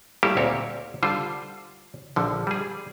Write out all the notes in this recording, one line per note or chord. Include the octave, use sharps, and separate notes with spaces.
G3 A3 A#3 E4 F4 G4
D2 A#2 C4 G4 C#5
D3 G3 F4 C5
A#1 D3 F3
G3 G#4